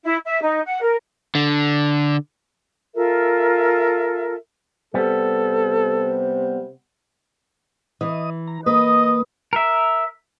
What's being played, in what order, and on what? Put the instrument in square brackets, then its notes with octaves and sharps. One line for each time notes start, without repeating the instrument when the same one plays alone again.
[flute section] E4
E5
D#4
F#5
A#4
[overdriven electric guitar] D3
[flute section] F4 A4 A#4 E5
[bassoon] C3 [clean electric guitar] G3 B3 [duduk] A4
[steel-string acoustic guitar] E3 [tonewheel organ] D#5 D#6
[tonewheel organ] A#5
[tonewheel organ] A#3 [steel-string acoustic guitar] B4 [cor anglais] D#5 [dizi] D#6
[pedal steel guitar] A#4 E5